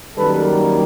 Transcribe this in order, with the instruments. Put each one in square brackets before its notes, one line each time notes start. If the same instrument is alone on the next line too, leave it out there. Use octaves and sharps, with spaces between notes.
[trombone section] F#2 D#3 G3 A#3 A4 B4